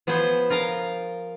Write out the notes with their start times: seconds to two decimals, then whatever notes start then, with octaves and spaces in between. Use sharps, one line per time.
0.07 F3 B3 G#4 B4 C5
0.50 F4 A#4 F5 A#5